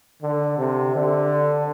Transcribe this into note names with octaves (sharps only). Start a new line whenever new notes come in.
D3
C3
D3